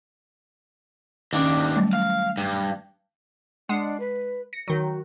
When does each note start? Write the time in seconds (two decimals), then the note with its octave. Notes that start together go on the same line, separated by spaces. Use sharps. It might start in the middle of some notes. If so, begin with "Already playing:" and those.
1.33 D#2 D#3 C#4 D4
1.75 F#3 G3 A3
1.93 F5
2.37 G2
3.69 G#3 D4 F#5 C7
4.00 B4
4.53 A#6 C#7
4.68 D#3 F#3 F#4